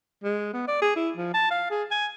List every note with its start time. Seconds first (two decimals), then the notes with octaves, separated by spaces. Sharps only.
0.24 G#3
0.54 B3
0.68 D5
0.82 G#4
0.96 E4
1.17 F3
1.34 A5
1.51 F5
1.70 G#4
1.91 G#5